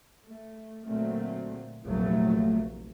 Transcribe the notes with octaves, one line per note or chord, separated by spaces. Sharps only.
A3
A#2 D3 F#3 A3 C4
F1 A#1 D#2 F#3 A3